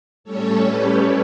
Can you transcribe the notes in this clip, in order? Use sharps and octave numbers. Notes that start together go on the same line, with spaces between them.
A2 G3 C#4 A4 C#5
G4 B4